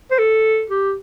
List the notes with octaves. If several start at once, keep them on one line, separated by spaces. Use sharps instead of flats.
C5
A4
G4